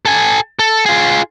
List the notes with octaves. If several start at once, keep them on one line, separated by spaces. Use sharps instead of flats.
A4 G#5
A4
F4 G#4